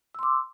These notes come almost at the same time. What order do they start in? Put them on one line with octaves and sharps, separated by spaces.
E6 C6 D6